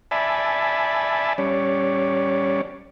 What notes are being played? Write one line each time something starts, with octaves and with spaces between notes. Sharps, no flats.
D5 E5 G#5 A5 B5
G3 C#4 C#5 D5